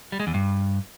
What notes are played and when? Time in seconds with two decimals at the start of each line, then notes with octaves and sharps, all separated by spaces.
0.12 G3
0.20 G#3
0.27 E2
0.34 G2